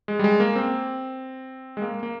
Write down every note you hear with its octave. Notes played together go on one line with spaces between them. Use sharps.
G#3
G3
G#3
A#3
C4
G#3
A#3
A#3